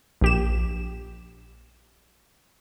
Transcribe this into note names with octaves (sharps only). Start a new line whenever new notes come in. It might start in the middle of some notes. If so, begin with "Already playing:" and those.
A#1 G4 E7